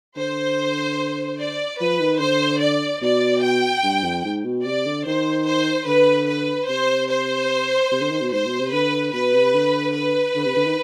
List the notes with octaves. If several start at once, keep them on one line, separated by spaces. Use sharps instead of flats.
D3 C5
D5
F3 B4
D#3
D3 C5
D5
B2 D5
G5
G2
F2
G#2
B2
C3 D5
D3
D#3 C5
C5
D3 B4
B4
C3 C5
C5
C3
D3
D#3
B2
G#2 C5
B2
C3
D3 B4
B2 B4
C3
D3
B4
D3
C3
D3
D#3